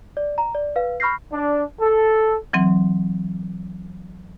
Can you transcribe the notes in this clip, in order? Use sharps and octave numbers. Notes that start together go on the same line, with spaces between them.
D5
A#5
D5
B4 F5
B5 C#6 F6 G6 A#6 C7
D4
A4
E3 F#3 C4